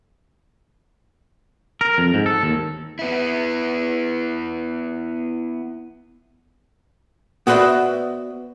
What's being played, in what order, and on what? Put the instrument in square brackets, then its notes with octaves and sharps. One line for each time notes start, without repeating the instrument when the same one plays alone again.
[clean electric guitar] A#4
F2
G#2
A4
D#2
[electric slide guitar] B3 E4
[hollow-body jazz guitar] B3 F#4 B4 C5 D5 E5